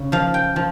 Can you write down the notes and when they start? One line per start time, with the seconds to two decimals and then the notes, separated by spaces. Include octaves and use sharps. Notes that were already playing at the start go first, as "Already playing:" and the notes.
Already playing: C#3
0.12 F3 F5
0.34 G5
0.56 F3